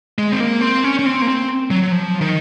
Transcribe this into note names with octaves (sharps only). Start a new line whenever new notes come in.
G#3
C4
A#3
C4
C#4
C#4
C4
A#3
C4
F#3
F3
D#3